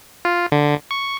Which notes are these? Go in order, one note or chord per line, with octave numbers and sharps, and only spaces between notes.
F4
D3
C#6